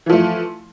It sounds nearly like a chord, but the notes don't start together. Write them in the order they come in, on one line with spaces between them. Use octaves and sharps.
E3 F3 A3